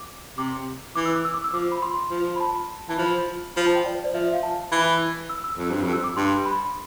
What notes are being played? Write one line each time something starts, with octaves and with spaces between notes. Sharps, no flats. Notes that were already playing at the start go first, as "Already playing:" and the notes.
Already playing: D6
C3 D6
E3 D6
E6
D6
E6
D6
E6
F3 D6
B5
C6
F3
B5
A5
E3 A5
F3 B5
F3 B5
A5
G5
D5
C5
D5
F3 E5
E5
F5
A5
E3 B5
E6
E6
F2
G2
F2
E6
D6
G2 C6
B5